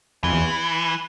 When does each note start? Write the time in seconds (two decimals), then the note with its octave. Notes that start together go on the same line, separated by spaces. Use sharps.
0.24 F2 E3
0.34 E2